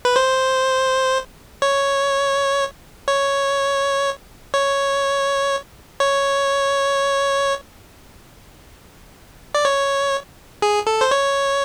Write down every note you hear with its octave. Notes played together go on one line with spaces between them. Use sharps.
B4
C5
C#5
C#5
C#5
C#5
D5
C#5
G#4
A4
C5
C#5